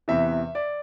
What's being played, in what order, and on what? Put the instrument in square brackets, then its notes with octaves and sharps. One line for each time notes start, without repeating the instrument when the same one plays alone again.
[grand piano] E2 C3 E3 E5
D5